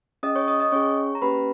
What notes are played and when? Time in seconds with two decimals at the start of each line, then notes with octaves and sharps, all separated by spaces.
0.23 C#4 G#4 D#5 D#6
0.36 C#5 C#6
0.48 D#5 D#6
0.60 D#5 D#6
0.72 C#4 G#4 C#5 C#6
1.15 A#5
1.22 A#3 C#4 G4 B4 B5